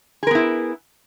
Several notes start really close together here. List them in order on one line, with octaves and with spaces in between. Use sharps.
G#4 A#4 B3 E4